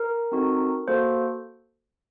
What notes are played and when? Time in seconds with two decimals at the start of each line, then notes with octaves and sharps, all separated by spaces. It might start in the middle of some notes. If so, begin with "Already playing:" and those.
Already playing: A#4
0.32 C4 D#4 F#4 A4
0.88 A#3 F#4 A4 C5